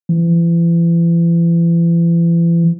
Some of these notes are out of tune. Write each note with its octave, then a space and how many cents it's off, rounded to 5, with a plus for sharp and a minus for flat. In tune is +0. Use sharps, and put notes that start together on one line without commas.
E3 +40